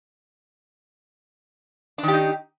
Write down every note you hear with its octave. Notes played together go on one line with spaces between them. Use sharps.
D#3 D4 D#4 G4